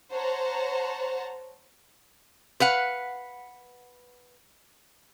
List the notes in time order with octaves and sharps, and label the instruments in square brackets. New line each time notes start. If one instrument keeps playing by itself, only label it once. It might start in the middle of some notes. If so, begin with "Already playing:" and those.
[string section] C5 C#5 F#5 A5 A#5
[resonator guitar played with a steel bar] B4 F5 F#5